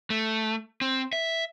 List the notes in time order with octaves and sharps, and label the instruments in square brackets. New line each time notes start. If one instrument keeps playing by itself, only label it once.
[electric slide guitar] A3
C4
E5